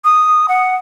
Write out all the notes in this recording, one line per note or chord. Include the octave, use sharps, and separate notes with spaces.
D#6
F#5